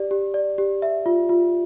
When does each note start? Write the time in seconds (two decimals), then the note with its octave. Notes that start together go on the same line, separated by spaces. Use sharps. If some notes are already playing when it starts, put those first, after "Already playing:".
Already playing: G4 D5
0.11 G4
0.34 D5
0.58 G4
0.82 E5
1.06 F4
1.29 F4